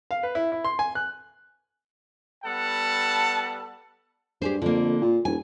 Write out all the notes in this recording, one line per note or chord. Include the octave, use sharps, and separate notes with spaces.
F5
B4
E4
E4
C6
G#5
F#6
G3 B3 A4 F#5 A5
G2 G4 G#4 C5
F2 D3 A#3
A#2
E1 G#5